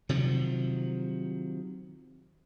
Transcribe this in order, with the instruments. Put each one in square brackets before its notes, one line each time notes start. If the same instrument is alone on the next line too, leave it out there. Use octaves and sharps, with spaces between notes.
[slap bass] C3 D#3 F3 F#3